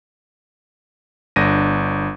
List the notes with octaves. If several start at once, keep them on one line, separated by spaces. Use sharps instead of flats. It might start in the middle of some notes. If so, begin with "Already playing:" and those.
G1 D4 A#6 D#7